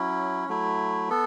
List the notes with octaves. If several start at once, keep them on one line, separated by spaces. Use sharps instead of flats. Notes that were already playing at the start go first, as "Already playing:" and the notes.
Already playing: F#3 C#4 E4
F#3 A3 E4
B3 A4